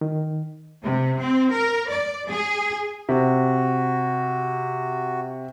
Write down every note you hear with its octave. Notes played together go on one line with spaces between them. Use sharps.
D#3
C3
C4
A#4
D5
G#4
C3 F#4